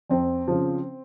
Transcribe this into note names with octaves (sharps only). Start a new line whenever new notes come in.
F2 C4
C#3 F3